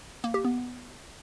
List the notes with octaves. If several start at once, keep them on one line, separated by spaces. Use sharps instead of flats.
A#3
G4
B3